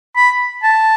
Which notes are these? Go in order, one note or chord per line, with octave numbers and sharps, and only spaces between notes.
B5
A5